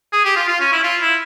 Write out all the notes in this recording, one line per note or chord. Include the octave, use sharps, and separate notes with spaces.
G#4
G4
F4
F4
C#4
E4
F4
E4